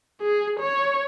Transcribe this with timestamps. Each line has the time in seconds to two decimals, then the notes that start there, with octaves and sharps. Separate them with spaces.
0.21 G#4
0.60 C#5